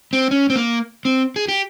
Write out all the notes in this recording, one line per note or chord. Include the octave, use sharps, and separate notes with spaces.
C4
C#4
C4
A#3
C4
G#4
G4